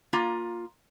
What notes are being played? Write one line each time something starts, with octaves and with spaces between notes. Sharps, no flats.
A#3 F4 A#5